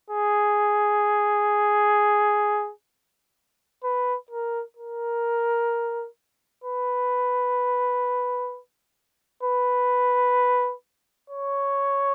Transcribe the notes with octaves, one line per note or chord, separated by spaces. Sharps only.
G#4
B4
A#4
A#4
B4
B4
C#5